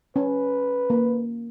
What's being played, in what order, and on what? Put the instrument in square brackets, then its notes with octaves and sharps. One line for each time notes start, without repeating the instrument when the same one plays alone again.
[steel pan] C#4 [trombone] B4
[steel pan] A#3